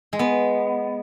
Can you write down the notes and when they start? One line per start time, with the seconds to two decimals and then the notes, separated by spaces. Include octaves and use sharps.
0.13 G#3
0.19 B3